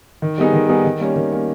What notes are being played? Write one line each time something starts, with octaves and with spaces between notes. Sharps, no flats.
D#3
G3 B3 D#4 G#4
D#3
G3 B3 D#4 G#4
D#3
G3 A#3 C#4
D#3
G3 A#3 C#4